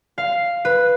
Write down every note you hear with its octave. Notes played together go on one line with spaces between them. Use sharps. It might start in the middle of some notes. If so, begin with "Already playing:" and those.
F5
B4